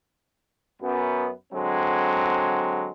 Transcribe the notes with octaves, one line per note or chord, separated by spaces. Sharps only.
F#2 B3
D3 F#3 G#3 C4